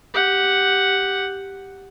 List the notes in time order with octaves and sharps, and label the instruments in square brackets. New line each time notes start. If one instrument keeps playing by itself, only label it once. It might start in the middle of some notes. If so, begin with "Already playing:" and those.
[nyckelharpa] G4 F#5